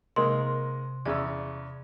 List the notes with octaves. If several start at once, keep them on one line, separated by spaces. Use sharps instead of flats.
C3 D#3 G#3 A#3 C6
E2 C#3 D5 E6